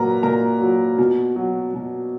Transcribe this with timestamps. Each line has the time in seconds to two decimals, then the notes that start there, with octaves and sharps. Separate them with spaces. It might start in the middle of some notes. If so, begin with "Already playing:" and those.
Already playing: A#2 F#3 A#4 B4 A#5
0.23 A#2 A#4 A#5
0.61 F#3
0.98 B2
1.36 F#3
1.74 B2